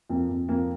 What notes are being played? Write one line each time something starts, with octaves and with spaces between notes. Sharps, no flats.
F2 A#3
F2
F2 A#3